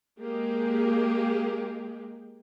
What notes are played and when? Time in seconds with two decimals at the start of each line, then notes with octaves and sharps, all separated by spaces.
0.18 G#3 A#3 G4 G#4